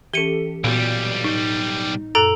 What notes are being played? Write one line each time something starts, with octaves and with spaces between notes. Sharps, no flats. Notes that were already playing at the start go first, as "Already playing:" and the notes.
E3 C#4 G4 A4 C#7 D#7 G7
B1 A#2 G3 B3 F4 F#4
A2 D#4
F#2 A#2 A4 A#5 F#6 D7